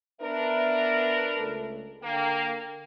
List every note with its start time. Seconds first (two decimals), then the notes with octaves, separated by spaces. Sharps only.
0.21 B3 D4 A#4 B4 E5
1.37 C#2 A3 A4
2.03 D3 A#3 G5